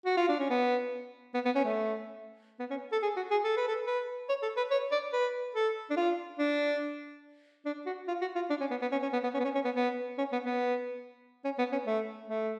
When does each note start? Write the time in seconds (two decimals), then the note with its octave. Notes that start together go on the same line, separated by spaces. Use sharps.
0.05 F#4
0.17 F4
0.29 D4
0.39 C#4
0.50 B3
1.34 B3
1.45 B3
1.55 C#4
1.65 A3
2.60 B3
2.70 C#4
2.92 A4
3.03 G#4
3.17 F#4
3.31 G#4
3.44 A4
3.57 B4
3.68 A4
3.87 B4
4.29 C#5
4.42 A4
4.57 B4
4.71 C#5
4.92 D5
5.13 B4
5.55 A4
5.90 D4
5.97 F4
6.39 D4
7.65 D4
7.86 F#4
8.08 F4
8.21 F#4
8.35 F4
8.50 D4
8.61 C#4
8.71 B3
8.82 B3
8.92 C#4
9.02 C#4
9.13 B3
9.24 B3
9.34 C#4
9.40 B3
9.44 C#4
9.55 C#4
9.65 B3
9.76 B3
10.18 C#4
10.32 B3
10.45 B3
11.45 C#4
11.59 B3
11.72 C#4
11.87 A3
12.28 A3